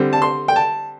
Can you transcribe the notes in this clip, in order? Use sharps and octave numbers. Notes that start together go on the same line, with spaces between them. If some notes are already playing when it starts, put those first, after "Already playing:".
Already playing: D3 G3 C4
A5
C6
G5
A5